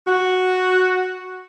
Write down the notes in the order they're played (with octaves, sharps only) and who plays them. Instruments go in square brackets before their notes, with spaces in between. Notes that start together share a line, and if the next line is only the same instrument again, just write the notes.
[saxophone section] F#4